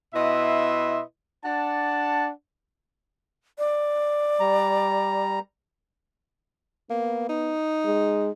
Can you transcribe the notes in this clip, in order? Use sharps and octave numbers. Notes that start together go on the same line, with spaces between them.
B2 E4 B4 D#5 E5 C6
D4 F#5 A5
D5
G3 A#5
A#3 B3
D#4
G#3